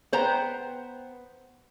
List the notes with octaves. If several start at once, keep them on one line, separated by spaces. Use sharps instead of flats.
B3 C5 G5 A#5